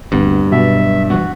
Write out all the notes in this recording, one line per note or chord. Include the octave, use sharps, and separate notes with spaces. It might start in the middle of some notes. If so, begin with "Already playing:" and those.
D1 D2 G2 B3 C4
B2 F#3 E5
E3 G3 B3 F#4